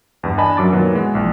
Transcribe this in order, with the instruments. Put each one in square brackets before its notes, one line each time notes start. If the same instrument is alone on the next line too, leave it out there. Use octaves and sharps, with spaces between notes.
[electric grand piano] E2 G2
D4 D#5 G#5 A5 B5
F#2 F#3 D6 A6
A#2 D#3 F#3 B3
E3 G#3 B3
A#1